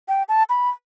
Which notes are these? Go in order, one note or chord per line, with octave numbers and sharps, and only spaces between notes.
G5
A5
B5